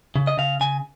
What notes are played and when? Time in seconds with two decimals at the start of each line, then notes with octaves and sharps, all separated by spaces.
0.16 C#3
0.27 D#5
0.38 C#3 F5
0.61 C#3 G#5